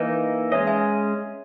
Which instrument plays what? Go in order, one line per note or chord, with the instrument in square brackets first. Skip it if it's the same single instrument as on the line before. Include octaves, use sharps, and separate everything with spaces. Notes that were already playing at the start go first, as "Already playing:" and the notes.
Already playing: [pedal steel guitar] E3 A#3 D#4 [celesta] B4 D#5
[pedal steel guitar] G#3 C#4 G#4 D#5 [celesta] C#5 E5
[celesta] E5 G#5